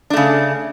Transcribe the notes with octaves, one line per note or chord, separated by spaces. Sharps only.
C#3 A3 D4